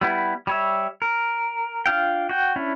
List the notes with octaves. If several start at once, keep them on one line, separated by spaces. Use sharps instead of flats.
G3 B3 E4
G3 C#5 E5
A#4
D4 F4 F5 G5
F#4 G5
C#4 D4 E4